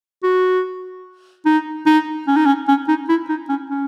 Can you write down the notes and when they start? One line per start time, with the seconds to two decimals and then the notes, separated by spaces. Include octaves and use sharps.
0.23 F#4
1.46 D#4
1.86 D#4
2.28 C#4
2.37 D#4
2.46 C#4
2.68 C#4
2.88 D#4
3.09 E4
3.29 D#4
3.49 C#4
3.70 C#4